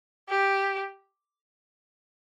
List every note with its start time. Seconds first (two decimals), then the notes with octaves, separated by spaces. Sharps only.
0.29 G4